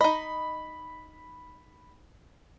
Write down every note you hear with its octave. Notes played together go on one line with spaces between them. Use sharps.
D#4 D#5 B5